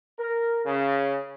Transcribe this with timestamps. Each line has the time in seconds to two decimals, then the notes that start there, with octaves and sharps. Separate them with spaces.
0.18 A#4
0.65 C#3